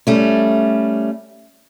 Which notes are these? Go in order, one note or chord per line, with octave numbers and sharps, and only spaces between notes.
G3 A3 C#4